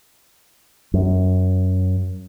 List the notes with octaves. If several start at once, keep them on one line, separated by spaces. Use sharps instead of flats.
F#2